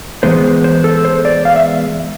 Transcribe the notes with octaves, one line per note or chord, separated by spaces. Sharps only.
E3 G#3 B3 C5
C5
A4
C5
D5
F5
E5